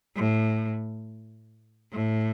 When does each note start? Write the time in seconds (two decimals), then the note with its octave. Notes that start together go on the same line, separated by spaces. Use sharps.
0.16 A2
1.92 A2